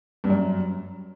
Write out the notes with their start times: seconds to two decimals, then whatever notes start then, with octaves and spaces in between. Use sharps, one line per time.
0.24 G2
0.30 F#2